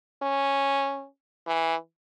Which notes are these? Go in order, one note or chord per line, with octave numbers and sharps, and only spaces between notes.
C#4
E3